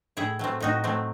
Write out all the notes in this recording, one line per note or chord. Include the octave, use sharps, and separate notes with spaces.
A2 E4 G#4
F#3 A3 C4
A2 D#4 F#4
F#3 A3 C4